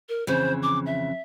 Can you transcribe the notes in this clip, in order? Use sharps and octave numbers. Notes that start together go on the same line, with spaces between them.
A#4
F2 C#3 E3 C5
D6
E5